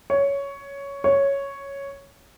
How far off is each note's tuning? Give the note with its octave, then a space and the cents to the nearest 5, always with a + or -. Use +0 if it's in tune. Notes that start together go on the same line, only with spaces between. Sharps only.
C#5 +10
C#5 +0